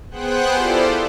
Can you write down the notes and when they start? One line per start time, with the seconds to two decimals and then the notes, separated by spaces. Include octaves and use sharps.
0.11 B3 G#4 C5 F#5 G5 F#6
0.52 E4 F4 G4 A4 C5 D5